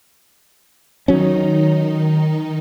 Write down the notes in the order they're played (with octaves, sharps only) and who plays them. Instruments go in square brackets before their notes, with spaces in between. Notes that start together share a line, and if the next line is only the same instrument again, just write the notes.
[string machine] D#3 D#4 [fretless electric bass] F#3 C#4